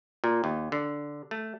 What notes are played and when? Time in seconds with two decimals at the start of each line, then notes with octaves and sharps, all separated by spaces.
0.24 A#2
0.44 D#2
0.72 D3
1.31 A3